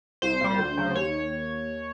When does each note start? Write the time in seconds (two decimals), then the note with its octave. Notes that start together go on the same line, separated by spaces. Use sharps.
0.22 C2 C5
0.41 A#2 G3
0.59 D2
0.77 C#3 F#3
0.95 D#2 C#5